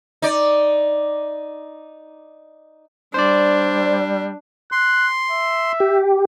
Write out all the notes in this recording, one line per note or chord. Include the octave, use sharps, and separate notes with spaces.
D#4 D5
G3 D4 C5 D5
C6 F#6
E5
G4